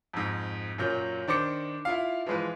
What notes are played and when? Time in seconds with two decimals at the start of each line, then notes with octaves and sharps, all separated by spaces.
0.13 F2 G#2
0.78 F#2 A#2 F#3 G6
1.28 D#3 D4 C5 D6 C#7
1.85 E4 F4 F5
2.27 E3 F3 G#3 F4 B4